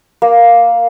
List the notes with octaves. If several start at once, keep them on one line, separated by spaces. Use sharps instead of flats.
A#3